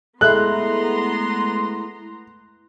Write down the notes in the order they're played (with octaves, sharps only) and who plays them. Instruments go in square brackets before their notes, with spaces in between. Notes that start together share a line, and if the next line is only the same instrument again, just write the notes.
[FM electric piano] G#3 A3 E4 [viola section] B3 A#5 C6 [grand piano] F#6